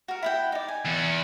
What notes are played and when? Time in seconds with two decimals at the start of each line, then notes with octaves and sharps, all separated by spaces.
0.08 F#4 A#4
0.23 E4 F#5 G5
0.52 D#4 D5
0.68 G#5
0.86 E2